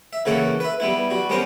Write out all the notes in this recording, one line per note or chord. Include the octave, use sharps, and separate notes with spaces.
E5
C#3 E3 A#3 A4 C#5 F#5
B4 E5
G3 B3 E4
G3 F#4
G3 B3 C#4 A#4 C5